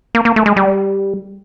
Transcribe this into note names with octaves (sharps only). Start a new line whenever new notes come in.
A#3
A#3
A3
G#3
G3